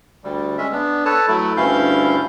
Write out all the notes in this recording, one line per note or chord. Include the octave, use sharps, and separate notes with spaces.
D2 G3
G#3 C#4 E5
B3 D4
A4 B4 C#5 A5
F#3 A3 E4
D2 G2 C#4 E4 F5 G6